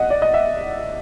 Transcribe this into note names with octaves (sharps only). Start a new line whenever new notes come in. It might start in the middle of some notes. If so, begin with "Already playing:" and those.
Already playing: D#5 F#5
D5
D#5
E5